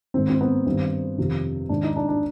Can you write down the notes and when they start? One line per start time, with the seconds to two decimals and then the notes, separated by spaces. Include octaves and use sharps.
0.14 G#2 D#3 C4
0.29 C4
0.41 B3
0.66 G2 D#3 C4
1.18 F2 C3 D#3
1.69 G#2 D#3 D4
1.83 D#4
1.96 D4
2.09 D4